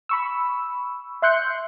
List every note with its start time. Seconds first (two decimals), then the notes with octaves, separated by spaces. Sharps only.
0.09 B5 C#6 E6
1.22 E5 C6 F#6 G6 C#7